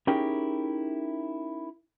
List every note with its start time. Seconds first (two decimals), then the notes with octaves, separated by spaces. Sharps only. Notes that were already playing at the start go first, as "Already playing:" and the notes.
0.07 C#4 D#4 E4 G4 G#4 A#4